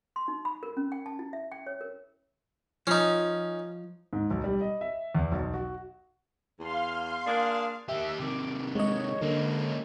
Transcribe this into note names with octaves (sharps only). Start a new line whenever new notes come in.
C6
D#4
B5
A#4
C#4
G5
A5
E4
E5
G5
C#5
A#4
F3 C#4 D#4
G#2
B1
G3
D#5
E5
E2
B1
F#4
E2 F5 C6
A#3 D4 G#4 D5
D#3 G4 E5
C3 D#3 D6
G#3 C#5 D#5
D3 A#3 C#4